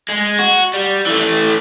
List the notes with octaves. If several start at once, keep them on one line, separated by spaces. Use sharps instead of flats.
G#3
F#4
G3
E3 A3